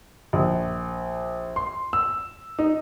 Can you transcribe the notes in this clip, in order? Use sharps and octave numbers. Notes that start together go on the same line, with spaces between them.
A#1
C6
E6
D#4